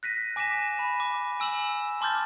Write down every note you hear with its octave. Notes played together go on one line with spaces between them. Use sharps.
F#6 A#6 B6 D#7
G#5 D6 A#6 B6 D#7 E7
B5 D#7
D6
G#5 E6 E7 F#7
A5 C6 D6 F6 G6 A6